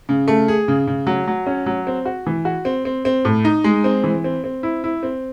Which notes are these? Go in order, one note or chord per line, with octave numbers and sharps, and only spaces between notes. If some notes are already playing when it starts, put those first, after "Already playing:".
C#3
A3
G#4
C#3
C#3
F#3
F#3
C#4
F#3
C4
F#4
E3
F#4
C4
C4
C4
A2
D#4
G#3
C4
E3
C4
C4
E4
E4
C4